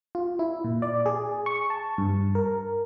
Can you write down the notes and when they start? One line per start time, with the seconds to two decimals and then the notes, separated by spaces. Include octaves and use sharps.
0.15 F4
0.39 E4
0.64 A#2
0.82 D5
1.06 G#4
1.46 C#6
1.70 A5
1.98 G2
2.35 A#4